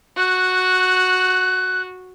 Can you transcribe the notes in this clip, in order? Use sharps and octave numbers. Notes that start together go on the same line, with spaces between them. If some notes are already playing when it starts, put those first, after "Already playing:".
F#4 F#6